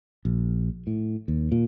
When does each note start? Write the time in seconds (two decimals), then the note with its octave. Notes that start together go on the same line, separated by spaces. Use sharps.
0.25 A#1
0.87 A2
1.28 D#2
1.52 A#2